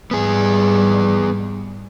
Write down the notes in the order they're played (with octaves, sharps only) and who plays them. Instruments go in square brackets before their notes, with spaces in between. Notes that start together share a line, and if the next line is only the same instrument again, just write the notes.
[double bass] G#2 G3 [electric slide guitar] B3 G#4